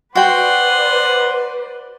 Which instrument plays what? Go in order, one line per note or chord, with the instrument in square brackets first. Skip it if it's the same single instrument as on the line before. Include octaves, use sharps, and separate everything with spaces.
[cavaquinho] F#4 G5 [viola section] B4 C5 D5 [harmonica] F#5 C6